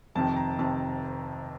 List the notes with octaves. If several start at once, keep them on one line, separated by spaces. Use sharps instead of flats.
F1 F2 C3 D#3 A5
A#5
F1 F2 C3 D#3 A5